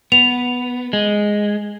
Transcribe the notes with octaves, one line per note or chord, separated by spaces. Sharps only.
B3 F7
G#3